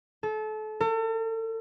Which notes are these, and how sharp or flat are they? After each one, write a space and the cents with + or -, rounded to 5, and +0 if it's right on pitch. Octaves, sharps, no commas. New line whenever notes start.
A4 -30
A4 +40